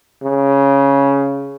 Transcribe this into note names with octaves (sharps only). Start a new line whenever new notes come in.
C#3